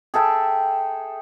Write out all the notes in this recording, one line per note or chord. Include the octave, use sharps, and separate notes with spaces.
G#4 A4 E5 G5